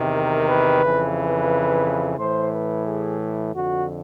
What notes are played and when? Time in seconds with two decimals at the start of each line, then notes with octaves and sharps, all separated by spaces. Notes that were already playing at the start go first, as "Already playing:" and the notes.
Already playing: E2 C3 D#3
0.15 A#4
0.49 B4
0.83 F2 C#3 E3
1.17 B4
2.19 A2 E3 C5
2.53 B4
2.86 G#4
3.54 F2 D3 F#4